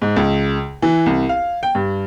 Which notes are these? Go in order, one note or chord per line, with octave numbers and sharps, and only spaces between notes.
G#2
C#2
E3
C2
F5
G5
G2